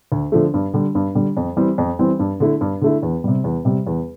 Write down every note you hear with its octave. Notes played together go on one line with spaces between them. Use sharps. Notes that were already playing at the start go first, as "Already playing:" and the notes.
D2
D3 F3 A3
G2
D3 G3
G2
D3 G3
F2
E3 G3 C4
F2
E3 G3 C4
G2
D3 A3 E4
G2
D3 A3 E4
E2
C3 G3
E2
C3 G3
E2